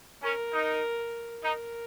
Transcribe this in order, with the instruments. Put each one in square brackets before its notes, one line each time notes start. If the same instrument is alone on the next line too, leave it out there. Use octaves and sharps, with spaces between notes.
[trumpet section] C#4 [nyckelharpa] A#4
[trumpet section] D#4
[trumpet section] D#4 [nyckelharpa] A#4